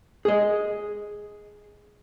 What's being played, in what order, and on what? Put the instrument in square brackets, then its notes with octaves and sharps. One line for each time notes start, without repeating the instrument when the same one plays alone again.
[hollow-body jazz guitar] G#4 D#5